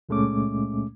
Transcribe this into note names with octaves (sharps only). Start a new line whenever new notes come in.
C#2 A#2 G#3 A3 C#4 D6